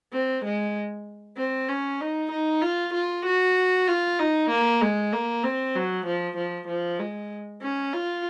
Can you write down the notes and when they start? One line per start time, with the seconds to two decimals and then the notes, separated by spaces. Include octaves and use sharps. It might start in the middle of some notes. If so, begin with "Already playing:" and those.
0.13 C4
0.45 G#3
1.37 C4
1.69 C#4
2.01 D#4
2.31 D#4
2.62 F4
2.94 F4
3.26 F#4
3.88 F4
4.19 D#4
4.50 A#3
4.81 G#3
5.13 A#3
5.43 C4
5.75 F#3
6.06 F3
6.37 F3
6.68 F3
6.99 G#3
7.61 C#4
7.93 F4